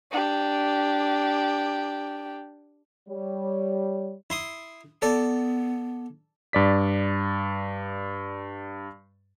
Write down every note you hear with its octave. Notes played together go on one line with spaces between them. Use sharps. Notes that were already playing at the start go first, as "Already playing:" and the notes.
D4 G4
G3 C#5
E4 C6 D#6
B3 A4 D5
G2 D5 B6